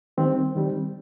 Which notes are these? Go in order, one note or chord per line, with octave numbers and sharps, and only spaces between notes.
D#3 G3 C4
D#3 G3 C4